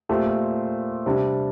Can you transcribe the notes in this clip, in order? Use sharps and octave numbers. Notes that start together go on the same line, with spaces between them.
A#2 A3 C4 G4 C5
C3 G3 D4